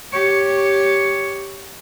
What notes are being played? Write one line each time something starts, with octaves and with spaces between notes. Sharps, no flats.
G4 C#5